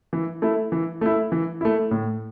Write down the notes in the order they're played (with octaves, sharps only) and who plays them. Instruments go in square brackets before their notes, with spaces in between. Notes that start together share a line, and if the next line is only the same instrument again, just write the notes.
[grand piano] E3
A3 E4
E3
A3 E4
E3
A3 E4
A2